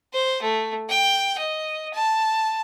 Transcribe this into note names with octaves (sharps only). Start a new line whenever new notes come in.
C5
A3
G5
D#5
A5